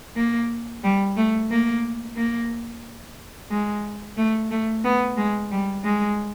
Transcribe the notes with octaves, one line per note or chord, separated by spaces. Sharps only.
A#3
G3
A3
A#3
A#3
G#3
A3
A3
B3
G#3
G3
G#3